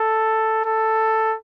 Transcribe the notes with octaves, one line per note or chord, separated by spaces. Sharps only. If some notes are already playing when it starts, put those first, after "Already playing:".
Already playing: A4
A4